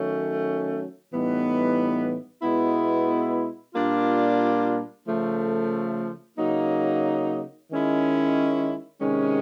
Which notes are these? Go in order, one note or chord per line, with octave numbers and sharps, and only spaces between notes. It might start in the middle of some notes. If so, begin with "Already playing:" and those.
Already playing: D#3 F#3 A3 C#4
A2 E3 G3 B3 D#4
B2 G#3 B3 E4
A#2 G3 A#3 D4 F4
C#3 F3 A3
C#3 F#3 A#3 D#4
D#3 G#3 C#4 E4
C3 D#3 G#3 C#4